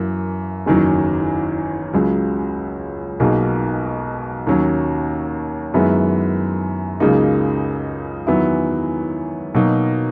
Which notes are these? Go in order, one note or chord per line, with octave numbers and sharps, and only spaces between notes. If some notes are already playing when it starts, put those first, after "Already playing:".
Already playing: F#2 E3 A#3
F#1 E2 D#3 F#3 C#4
C#2 C#3 F#3
B1 B2 A#3 D#4 G#4
D#2 D#3 F#3 C#4
F#2 D#3 G#3 B3 E4
C#2 C#3 F#3 A#3 D#4
E2 D#3 F#3 B3 E4
B2 F#3 A#3 D#4